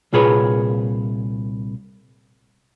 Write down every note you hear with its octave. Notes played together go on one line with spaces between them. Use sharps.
C2 A#2 F4 G#4 B4 C#5